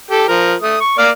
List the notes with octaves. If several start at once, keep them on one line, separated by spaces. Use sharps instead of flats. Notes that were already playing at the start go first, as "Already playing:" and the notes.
G4 A4
F3 A#4
A3 D#6
C#6
A#3 D5 F6